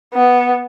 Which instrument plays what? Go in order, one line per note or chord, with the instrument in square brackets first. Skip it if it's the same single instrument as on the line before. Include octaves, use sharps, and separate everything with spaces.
[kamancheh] B3